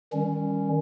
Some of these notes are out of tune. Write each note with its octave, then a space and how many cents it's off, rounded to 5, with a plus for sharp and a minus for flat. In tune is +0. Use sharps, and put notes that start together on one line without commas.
D#3 +0 G3 +15 C#4 +0